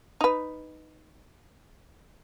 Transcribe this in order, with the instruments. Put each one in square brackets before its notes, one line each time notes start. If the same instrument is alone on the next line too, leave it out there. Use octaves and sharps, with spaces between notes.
[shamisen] D#4 B4